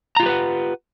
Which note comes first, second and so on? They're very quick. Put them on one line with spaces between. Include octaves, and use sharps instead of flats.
A#5 F4 G4 B4 F#5